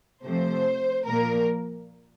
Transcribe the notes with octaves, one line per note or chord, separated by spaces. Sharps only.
C3 F3 A3 C5
A#2 F3 A#3 A#4